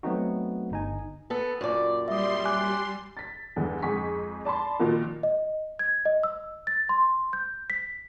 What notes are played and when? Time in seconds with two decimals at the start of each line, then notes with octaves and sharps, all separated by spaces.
0.03 F#3 A3 B3 C4 D#4 F#4
0.71 G1 D#4 G#5
1.30 B3 A4
1.61 F#2 A#2 D5
2.08 G3 E5 C6 D#6
2.45 G#5 D6 F#6
3.17 A6 B6
3.56 E2 G2 D3 E3
3.82 F2 G#2 G#4 G#5 C#6 B6
4.45 D5 A5 B5 C6
4.79 A#2 D#3 F3 A#3 F#4
5.23 D#5
5.79 G#6
6.05 D#5
6.23 E6
6.67 A6
6.89 C6
7.33 G6
7.70 B6